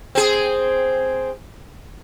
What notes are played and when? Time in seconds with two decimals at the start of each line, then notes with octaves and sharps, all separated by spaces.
0.15 C4 G#4